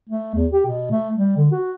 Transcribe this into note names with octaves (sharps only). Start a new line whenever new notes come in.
A3
E2
G4
B2
A3
G3
D3
F#4